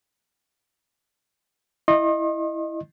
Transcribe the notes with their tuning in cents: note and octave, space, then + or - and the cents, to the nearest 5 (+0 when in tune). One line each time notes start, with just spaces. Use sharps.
E4 +0 D#5 -20 C6 +45